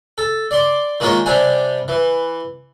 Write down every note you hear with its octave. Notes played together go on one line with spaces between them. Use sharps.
A4
D5 C6 D6
D#3 G#3 A#3 F4 C#5
C3 G3 D4 G#5
E3